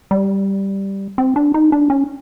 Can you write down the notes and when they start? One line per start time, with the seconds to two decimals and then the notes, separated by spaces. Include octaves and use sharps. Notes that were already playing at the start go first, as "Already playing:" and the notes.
0.11 G3
1.18 C4
1.36 D4
1.54 D#4
1.72 D4
1.90 C#4